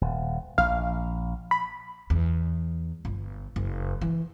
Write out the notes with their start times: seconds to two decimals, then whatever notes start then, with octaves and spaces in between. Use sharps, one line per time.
0.01 D#1
0.58 A#1 F5
1.51 B5
2.10 E2
3.05 G1
3.56 F#1
4.01 E3